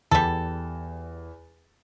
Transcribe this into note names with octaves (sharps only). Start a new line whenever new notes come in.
E2 G3 A4